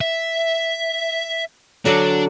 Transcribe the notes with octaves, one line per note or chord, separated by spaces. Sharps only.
E5
D3 F#3 D4 F#4